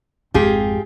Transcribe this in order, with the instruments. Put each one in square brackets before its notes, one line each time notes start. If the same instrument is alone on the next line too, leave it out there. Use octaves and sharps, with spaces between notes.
[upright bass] G#1 F2 [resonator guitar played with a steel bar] F4 G4 G#4